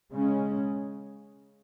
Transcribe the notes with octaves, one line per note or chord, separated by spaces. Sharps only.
C#3 G#3 C#4